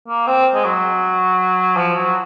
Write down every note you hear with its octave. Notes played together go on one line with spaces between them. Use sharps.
A#3
C4
G#3
F#3
F3
F#3